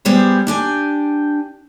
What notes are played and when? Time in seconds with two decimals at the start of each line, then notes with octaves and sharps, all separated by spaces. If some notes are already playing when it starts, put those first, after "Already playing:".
0.05 G3 B3 G4 G#4 C5
0.47 D4 G4 G#5